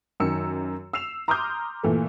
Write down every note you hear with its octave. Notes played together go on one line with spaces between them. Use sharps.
F#2 D#3 E6 C#7
E6 C7 E7 F7
A#5 C6 D6 D#6 F6 G6
A#2 E3 A3